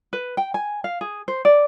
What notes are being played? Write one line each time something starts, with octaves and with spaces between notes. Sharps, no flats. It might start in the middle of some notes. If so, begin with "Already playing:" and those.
B4
G5
G#5
F5
G#4
C5
D5